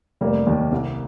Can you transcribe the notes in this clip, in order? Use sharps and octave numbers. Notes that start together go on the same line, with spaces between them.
F1 G3 A#3
D#2 D#3
C2